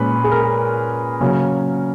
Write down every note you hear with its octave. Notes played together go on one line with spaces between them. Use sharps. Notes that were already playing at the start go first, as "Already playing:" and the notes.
Already playing: A#2 G#3 C#4 B4
G#4
A#4
C#3 F#3 A#3 C#4